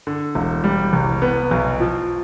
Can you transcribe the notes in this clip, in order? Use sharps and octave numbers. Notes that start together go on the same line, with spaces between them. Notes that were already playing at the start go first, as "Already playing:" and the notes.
D3
E1
G3
C2
B3
B1
F3